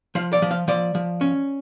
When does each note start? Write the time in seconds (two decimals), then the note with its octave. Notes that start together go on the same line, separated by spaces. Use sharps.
0.15 F3 F5
0.33 D5
0.42 F3
0.51 F5
0.68 F3 D5
0.95 F3
1.21 C#4